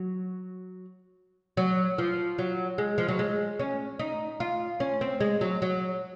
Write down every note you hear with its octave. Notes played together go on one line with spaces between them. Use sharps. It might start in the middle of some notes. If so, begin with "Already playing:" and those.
Already playing: F#3
F#3
F3
F#3
G#3
F3
F#3
G#3
C#4
D#4
F4
C#4
C4
G#3
F#3
F#3